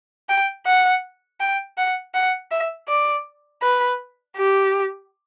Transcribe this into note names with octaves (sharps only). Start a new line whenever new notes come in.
G5
F#5
G5
F#5
F#5
E5
D5
B4
G4